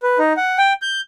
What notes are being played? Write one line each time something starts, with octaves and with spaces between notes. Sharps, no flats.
B4
D#4
F#5
G5
G6